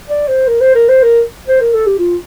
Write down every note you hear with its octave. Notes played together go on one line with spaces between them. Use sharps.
D5
C5
A#4
C5
A#4
C5
A#4
C5
A#4
A4
G4
F4